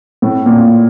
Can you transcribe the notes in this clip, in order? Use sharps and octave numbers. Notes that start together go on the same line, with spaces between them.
A2
A#2